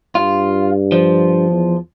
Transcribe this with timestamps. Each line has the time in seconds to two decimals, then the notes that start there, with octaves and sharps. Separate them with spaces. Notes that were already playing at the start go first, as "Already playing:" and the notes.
0.15 G2 F4
0.92 F3
1.50 E2